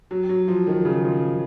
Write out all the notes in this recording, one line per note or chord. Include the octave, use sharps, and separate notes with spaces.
F#3
F#3
F3
D#3
C#3
F3